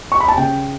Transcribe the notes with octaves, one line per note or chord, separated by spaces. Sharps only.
C#6
B5
A5
C#3 G5